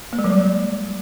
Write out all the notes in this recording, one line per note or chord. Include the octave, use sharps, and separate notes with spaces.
A#3
G#3
F#3
G3